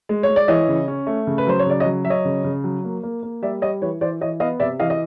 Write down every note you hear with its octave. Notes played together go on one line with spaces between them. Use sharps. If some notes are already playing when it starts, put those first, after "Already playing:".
G#3
G#3 C#5
D5
E3 C#5 D#5
C#3
C#4
A3
C#3
B4
F#3 C5
C#5
C#3 D5
C#5 D#5
F#3
F#3 E5
C#5 D#5
C#3
C#3
F#3
A#3
A#3
A#3
G3 D5 E5
G3 C#5 D#5
E3 B4 C#5
E3 C5 D5
E3 C#5 D#5
B3 D#5 F5
C3 D5 E5
E3 D#5 F5
D#5